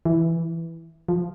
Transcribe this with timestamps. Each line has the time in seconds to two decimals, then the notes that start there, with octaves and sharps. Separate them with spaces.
0.05 E3
1.09 F3